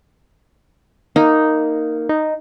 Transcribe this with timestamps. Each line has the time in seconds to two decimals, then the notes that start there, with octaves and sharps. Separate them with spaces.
1.16 A#3 D#4
2.09 D#4